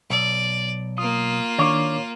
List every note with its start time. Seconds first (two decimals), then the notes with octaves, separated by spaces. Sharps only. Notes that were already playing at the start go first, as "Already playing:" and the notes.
0.10 B1 D5
0.98 A#3 F4 D#6
1.59 D#3 D4 C#5 D6